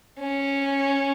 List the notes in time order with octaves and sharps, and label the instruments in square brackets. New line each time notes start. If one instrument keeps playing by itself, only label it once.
[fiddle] C#4